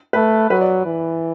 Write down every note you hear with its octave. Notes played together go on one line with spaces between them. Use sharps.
A3 B4
F#3 B4
D5
E3